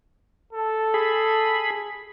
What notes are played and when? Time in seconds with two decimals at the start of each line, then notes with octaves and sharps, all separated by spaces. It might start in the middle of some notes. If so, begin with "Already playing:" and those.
0.53 A4
0.94 G#4 B5